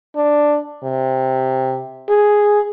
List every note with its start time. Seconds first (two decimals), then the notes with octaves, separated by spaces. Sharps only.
0.16 D4
0.83 C3
2.09 G#4